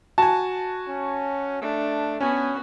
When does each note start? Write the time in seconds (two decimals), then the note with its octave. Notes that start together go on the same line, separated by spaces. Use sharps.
0.18 F#4 G#5 A5
0.88 C#4
1.62 A3 D4
2.20 B3 C#4 F#4 G#5